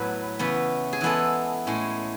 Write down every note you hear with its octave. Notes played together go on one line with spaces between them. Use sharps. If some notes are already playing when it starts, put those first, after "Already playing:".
Already playing: A2 F#3 B3 B4
C#3 E3 B3
G#4
E3 G#3 B3 A4
A2 G#3 C#4